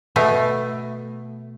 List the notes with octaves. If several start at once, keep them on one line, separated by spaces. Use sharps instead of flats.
B2 A3